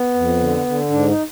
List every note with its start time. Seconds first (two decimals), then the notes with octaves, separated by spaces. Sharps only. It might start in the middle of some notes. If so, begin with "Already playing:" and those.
Already playing: B3
0.15 F2
0.40 D3
0.66 D3
0.90 G#2 D4
1.08 D#4